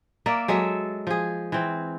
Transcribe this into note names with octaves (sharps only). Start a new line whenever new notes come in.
A#3 A#4 D5 E5
F#3 G#3 A4 E5
F3 G#4
E3 C4